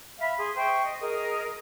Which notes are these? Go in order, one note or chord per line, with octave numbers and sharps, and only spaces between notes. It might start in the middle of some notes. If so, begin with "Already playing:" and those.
E5 F5 B5
G#4 C6
C5 E5 G5 C#6
D#5
G#4 A#4 D#5